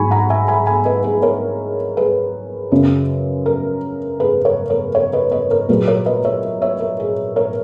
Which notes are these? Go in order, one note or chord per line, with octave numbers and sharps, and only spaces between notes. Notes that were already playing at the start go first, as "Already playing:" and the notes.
Already playing: G#2 F#3 G#5 B5 C#6
F#5 A#5
E5 G#5
G#5 B5
G#5 B5
B4 D#5
G#4 B4
A#4 C#5
G#4 B4
F#2 C#3 F#3
A#4
G#4 B4
A#4 C#5
A#4 C#5
A#4 C#5
B4 D#5
B4 D#5
A#4
A#2 F#3 G#4 B4
A#4 C#5
B4 D#5
C#5 E5
C#5 E5
A#4
G#4
A#4 C#5